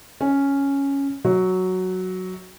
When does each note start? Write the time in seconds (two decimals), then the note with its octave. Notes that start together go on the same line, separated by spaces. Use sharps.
0.21 C#4
1.25 F#3